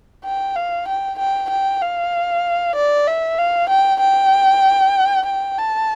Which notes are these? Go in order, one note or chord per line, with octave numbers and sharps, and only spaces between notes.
G5
F5
G5
G5
G5
F5
D5
E5
F5
G5
G5
G5
A5